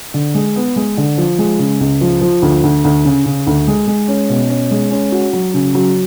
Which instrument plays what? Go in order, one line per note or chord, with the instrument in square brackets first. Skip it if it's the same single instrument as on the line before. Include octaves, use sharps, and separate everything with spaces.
[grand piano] D3
G#3
B3
G#3
D3
F3
G#3
C#3
C#2
F3
F3
D2
D2
D2
C#3
C#3
D2
G#3
G#3
C#4
B2
C#4
G#3
C#4
F#4
F#3
C#3
F#3